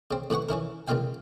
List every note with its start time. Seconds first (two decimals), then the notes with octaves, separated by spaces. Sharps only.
0.11 C#3 C4
0.30 A2 C3 B4 F#5 C#6
0.49 E3 C#4 E4 A#4
0.88 C#2 C#3 A#3 F4 F5 G5